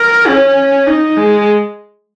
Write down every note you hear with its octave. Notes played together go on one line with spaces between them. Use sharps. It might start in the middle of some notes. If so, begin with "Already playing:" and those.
Already playing: A#4
C#4
D#4
G#3